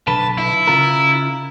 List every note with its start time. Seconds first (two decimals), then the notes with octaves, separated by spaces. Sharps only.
0.07 B1 D3 B4 A5
0.38 E4
0.67 C#3 F4 A#4